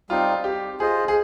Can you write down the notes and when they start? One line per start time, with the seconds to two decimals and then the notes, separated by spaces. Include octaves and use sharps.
0.10 G3 C4 D#4 F4
0.44 G4
0.80 F4 G#4 C5 D#5
1.08 G#4